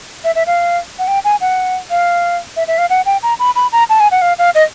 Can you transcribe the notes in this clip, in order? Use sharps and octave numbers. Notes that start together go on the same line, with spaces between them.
E5
E5
F5
F#5
G5
G#5
F#5
F5
E5
E5
F5
F#5
G5
A#5
B5
B5
A#5
A5
G#5
F#5
F5
F5
D#5